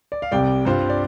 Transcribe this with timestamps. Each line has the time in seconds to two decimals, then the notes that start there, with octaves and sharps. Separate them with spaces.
0.12 D5
0.22 F5
0.32 C2 C3 G3 D5 G5
0.65 G2 G3 C4 F4 C5 F5
0.90 D5